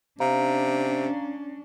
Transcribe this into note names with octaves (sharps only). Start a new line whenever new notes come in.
C3 C#4 D4 F5 A#5